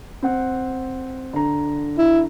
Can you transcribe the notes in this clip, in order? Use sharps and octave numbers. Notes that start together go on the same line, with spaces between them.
C4 F#5
D3 A#5
E4